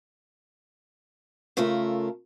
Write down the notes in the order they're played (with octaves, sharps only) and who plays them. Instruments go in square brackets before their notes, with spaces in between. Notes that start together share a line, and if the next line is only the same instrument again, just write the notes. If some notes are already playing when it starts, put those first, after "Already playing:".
[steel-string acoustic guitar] C#3 A3 F4 A4 A#4